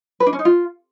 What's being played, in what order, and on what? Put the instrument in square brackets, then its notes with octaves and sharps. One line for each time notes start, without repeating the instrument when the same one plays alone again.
[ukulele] B4
D4
C#4
D#4
F4